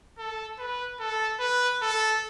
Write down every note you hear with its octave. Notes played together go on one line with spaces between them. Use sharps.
A4
B4
A4
B4
A4